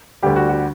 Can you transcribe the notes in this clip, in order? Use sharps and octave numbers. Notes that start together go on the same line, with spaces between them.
D2 D3 G3 G4
F#4
F#4